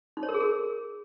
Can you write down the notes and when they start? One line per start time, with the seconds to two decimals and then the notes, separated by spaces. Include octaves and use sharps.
0.17 D#4
0.23 C#5
0.29 A#4
0.34 G#4
0.40 A#4